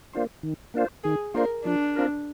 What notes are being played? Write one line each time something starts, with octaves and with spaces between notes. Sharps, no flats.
A#3 D4 F4 C5
D#3
A#3 D4 F4 C5
D#3 G#4
A#3 D4 F4 A#4 C5
F3 D4
C4 F4 A#4